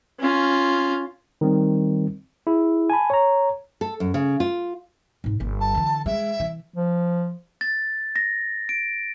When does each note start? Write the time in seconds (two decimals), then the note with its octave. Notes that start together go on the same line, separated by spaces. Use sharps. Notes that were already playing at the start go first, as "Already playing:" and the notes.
0.19 C#4 F4
1.41 D#3 G3 C4
2.47 E4 G#4
2.90 G#5 A5 B5
3.10 C#5 A#5
3.81 A4
4.00 F#2
4.14 C#3
4.40 F4
5.24 G#2 B3
5.40 G1 A#3
5.60 A5
5.75 D3 E3
6.06 G#3 E5
6.40 E3
6.76 F3
7.61 A6
8.16 A#6
8.69 D7